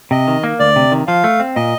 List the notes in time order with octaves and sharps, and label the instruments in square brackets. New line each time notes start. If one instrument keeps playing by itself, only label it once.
[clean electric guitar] C3 [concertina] D#5
[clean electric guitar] D#3
A#3
[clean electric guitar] D2 [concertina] D5
[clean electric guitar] C3
D#3
[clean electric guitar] F3 [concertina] F5
[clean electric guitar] A3
C4
[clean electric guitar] A#2 [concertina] D#5